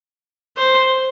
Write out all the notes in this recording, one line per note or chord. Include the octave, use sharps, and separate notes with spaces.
C5